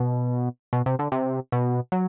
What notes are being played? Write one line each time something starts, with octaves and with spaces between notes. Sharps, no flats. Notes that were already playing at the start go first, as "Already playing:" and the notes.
Already playing: B2
B2
C3
D3
C3
B2
F#3